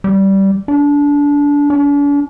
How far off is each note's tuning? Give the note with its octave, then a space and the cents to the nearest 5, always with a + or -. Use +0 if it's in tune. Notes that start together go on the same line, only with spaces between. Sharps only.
G3 -15
D4 -25
D4 -45